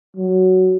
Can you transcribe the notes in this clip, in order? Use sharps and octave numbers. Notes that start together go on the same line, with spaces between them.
F#3